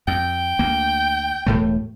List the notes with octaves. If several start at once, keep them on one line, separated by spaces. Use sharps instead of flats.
F2 G5
D2 A#3
E1 A2 A3